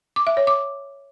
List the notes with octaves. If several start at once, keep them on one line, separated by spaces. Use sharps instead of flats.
D6
E5
C#5
D6